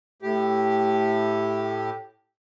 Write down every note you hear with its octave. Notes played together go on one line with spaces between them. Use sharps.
A2 G4